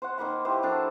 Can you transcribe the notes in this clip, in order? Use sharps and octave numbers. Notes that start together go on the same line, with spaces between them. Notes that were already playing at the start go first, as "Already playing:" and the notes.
C5 C#5 F#5
D#3 A#3 B5 C6
E4 G4 B4 C5
F#3 D4 A4